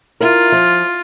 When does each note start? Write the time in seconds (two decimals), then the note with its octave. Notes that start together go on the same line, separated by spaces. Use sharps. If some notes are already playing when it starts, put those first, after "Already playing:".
0.20 E4 F4 A#4
0.52 F3